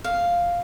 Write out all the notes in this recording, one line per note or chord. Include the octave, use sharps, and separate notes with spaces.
F5